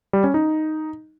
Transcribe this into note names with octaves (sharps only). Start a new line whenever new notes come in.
G3
C#4
D#4